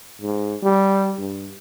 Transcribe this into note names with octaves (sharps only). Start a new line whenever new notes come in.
G#2
G3
G2